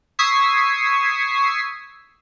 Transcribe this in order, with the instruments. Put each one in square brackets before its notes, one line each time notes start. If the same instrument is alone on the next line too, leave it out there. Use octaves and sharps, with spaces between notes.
[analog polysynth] C#6 D#6 E6 G#6 B6 C7